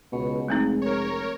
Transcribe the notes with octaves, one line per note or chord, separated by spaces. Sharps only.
C#2 B2
F1 G#3 A3 C4 D#4
A#4 C#5